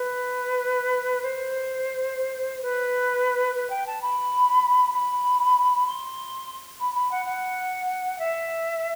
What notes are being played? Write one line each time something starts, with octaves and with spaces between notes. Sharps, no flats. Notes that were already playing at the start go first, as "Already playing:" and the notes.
Already playing: B4
C5
B4
B4
G5
A5
B5
B5
C6
B5
B5
F#5
F#5
E5